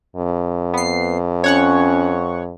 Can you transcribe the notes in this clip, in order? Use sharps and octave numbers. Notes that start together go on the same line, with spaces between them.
F2
B3 C7
C#4 C#5 F#5 C#6